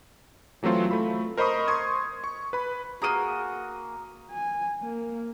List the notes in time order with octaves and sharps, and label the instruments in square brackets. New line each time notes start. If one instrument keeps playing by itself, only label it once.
[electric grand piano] E3 F#3 A3 C4 F4
A3 B5
A#4 C5 D#5 B5 C#6 D#6
C6 C#6 D#6 G#6
C#6
B4 B5
[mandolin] A#3 G#4 [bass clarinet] F#4 [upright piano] A#5 D#6 D#7
[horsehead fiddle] G#5
A#3